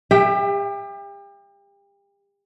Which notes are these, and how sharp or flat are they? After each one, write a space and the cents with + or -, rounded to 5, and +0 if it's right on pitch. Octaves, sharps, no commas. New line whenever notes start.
G4 +35 E5 +5 G5 -5